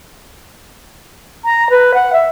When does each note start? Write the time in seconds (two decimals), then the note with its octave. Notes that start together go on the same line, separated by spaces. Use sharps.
1.45 A#5
1.70 B4
1.94 F#5
2.13 E5